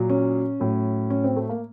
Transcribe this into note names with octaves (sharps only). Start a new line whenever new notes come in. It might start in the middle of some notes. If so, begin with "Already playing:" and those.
Already playing: A#2 F#3
C#4
A2 F#3
C#4
C4
A3
A#3